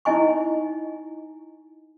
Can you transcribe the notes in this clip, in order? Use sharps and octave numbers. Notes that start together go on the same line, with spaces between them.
D#4 E4 D#5 G#5 C#6